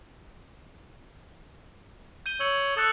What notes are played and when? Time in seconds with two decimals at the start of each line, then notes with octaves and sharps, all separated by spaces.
2.26 G6 D#7 G7
2.40 C#5 E6 F#7
2.77 A4 D#6 F#6 F#7